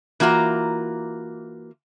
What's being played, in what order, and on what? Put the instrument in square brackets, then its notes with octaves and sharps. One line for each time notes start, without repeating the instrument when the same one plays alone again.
[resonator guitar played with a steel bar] E3 A#3 F4 F#4 A#5